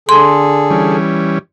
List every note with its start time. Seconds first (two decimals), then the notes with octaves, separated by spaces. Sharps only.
0.09 D3 G#4 A4 C6
0.70 E3 G3 C#4